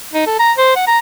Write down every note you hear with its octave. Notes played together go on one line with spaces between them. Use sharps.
D#4
A4
A#5
C5
F#5
A#5